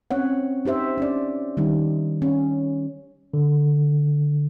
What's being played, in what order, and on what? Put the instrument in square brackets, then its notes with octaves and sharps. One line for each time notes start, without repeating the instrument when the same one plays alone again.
[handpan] C4 C#4 C#5 F#5
D#4 G4 C5 E5
C#4 D4 D5
D#3 G3 D#4
C#4
[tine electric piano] D3